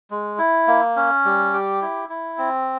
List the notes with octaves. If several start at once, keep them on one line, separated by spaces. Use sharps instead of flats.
G#3
E4
A#3
C#4
G3
G4
E4
E4
C4